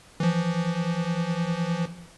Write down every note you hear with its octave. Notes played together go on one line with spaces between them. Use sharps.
E3 F3